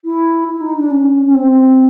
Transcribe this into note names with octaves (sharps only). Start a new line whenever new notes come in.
E4
E4
D#4
D4
C#4
C#4
C4